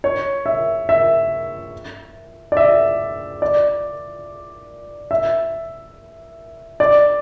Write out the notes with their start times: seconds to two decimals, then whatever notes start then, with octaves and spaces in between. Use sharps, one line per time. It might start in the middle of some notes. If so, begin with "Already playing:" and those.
0.04 C#5
0.46 E5
0.89 E5
2.52 D5
2.57 E5
3.42 D5
5.11 E5
6.80 D5